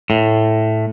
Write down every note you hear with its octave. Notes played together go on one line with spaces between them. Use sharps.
A2